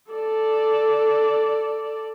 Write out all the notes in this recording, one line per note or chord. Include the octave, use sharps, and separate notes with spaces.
A4 D5